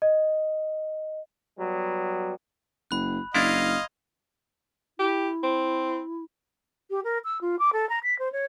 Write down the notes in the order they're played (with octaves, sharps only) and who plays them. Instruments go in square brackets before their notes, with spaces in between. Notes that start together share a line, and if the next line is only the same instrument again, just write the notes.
[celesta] D#5
[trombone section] F#3 G3 B3
[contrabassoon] F#1 [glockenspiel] B5 F#6
[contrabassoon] F#1 [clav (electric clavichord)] D4 E4 [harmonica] D#5 F5 [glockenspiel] C6 G#6 F7
[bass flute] E4 [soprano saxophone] G4
[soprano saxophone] C4
[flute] G4
A#4
E6
F4
D6
A4
A#5
B6
C5
C#5